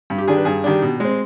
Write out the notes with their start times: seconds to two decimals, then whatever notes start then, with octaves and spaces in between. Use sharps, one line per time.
0.10 G2
0.18 G4
0.28 D#3 G3 D4 G#4
0.37 B4
0.45 G2 G#4
0.64 D#3 G3 D4
0.82 B2
1.00 G#3 C4